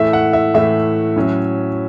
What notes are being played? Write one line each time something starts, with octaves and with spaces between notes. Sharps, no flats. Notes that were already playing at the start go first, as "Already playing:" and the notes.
Already playing: A2 E3 A3 E5
F#5
E5
A2 E3 A3 E5
A2 F#3 C#4